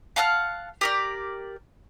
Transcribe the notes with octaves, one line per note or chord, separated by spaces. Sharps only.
F5 F#5 A5 F6
G4 A#4 D5